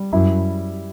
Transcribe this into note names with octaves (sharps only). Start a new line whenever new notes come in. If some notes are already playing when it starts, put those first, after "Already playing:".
Already playing: G3
F#2 E4